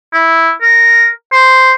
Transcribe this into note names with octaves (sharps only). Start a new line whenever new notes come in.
E4
A#4
C5